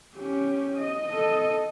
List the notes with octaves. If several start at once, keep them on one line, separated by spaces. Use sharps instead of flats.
C#4 G4
D#5
A4 D#5